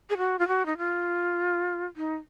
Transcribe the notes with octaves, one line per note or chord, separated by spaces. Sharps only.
G#4
F#4
F4
F#4
D#4
F4
D#4